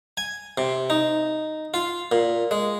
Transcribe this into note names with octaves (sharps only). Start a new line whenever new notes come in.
G#5
C3
D#4
F4
A#2
G#3